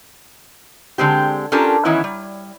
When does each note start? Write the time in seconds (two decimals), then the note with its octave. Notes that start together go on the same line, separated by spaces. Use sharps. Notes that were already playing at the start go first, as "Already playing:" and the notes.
0.98 D3 G#3 C4 G4
1.52 C#4 D4 F4 G4 A4 A#4
1.85 D#3 E3 B3 C#4 E4
2.04 G3